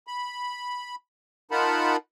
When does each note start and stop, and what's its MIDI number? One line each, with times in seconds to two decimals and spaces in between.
0.07 0.95 83
1.51 1.96 63
1.51 1.96 65
1.51 1.96 70
1.51 1.96 78
1.51 1.96 81
1.51 1.96 83